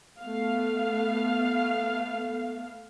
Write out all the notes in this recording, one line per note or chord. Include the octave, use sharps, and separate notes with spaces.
A3 B3 F5